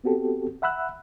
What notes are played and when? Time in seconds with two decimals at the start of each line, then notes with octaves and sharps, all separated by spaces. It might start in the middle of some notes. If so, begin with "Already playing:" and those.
0.04 B3 C4 F#4 G4 A4
0.62 E5 F#5 B5 E6 F#6